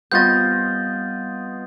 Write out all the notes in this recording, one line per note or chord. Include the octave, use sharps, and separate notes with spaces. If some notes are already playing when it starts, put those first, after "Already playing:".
G3 B3 C4 F4 D#5 G6 A6